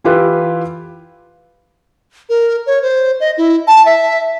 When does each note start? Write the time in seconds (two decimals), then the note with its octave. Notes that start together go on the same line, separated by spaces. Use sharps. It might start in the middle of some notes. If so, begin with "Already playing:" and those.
0.04 E3 E4 F4 G4 B4
2.29 A#4
2.66 C#5
2.82 C5
3.20 D#5
3.38 E4
3.67 A5
3.86 E5